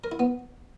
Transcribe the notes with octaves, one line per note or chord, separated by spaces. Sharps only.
A#4
E4
B3